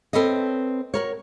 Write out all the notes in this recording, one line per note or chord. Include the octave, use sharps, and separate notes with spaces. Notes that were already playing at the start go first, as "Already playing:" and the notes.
C4 A4 B4 C#5 D#5
F#4 A#4 C#5